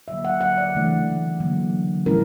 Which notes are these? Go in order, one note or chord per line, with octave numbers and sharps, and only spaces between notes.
D3 F#3 A#3 E5
F#5
F#5
D5
C#3 E3 A3 D4
D3 F#3 A#3
A#2 F3 G#3 C#4 E4 A#4